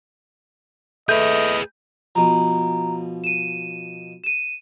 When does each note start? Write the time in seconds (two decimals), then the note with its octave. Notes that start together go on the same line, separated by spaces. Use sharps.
1.09 A3 G#4 B4 D#5 G6
2.15 B2 F3 A#5
3.24 D#7 E7
4.24 D#7 E7